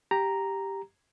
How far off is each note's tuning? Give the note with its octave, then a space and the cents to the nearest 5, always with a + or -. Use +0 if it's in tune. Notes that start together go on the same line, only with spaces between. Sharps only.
G4 +0 A#5 +0